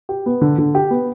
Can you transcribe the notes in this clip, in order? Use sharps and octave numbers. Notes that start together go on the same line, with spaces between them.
G4
B3
D3
D3
G4
B3